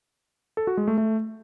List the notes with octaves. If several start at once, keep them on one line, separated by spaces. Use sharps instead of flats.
A4
F#4
G#3
A3
A3